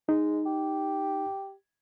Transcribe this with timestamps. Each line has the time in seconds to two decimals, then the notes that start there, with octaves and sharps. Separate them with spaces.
0.09 G#3 D#4
0.46 G4